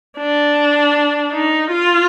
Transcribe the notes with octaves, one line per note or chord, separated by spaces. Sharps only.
D4
D#4
F4